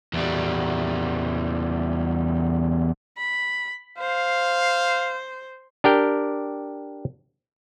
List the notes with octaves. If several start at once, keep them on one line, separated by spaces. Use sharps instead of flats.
E2 G3
B5
C5 F5
D4 G4 A#4 G5